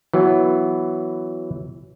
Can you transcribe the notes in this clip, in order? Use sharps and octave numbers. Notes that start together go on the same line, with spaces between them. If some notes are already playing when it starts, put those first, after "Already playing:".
E3 F#3 B3